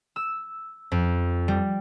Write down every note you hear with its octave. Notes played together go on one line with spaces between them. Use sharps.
E6
F2
G3